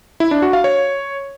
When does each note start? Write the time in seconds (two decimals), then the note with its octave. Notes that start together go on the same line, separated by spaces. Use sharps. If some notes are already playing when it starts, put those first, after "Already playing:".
0.20 E4
0.31 D4
0.42 F#4
0.53 F5
0.64 C#5